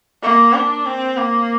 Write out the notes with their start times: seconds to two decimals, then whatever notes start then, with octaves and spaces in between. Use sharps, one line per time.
0.23 A#3
0.54 D4
0.86 C4
1.17 A#3